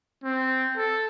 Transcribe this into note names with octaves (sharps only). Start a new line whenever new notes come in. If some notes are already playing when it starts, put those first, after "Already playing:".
C4
A4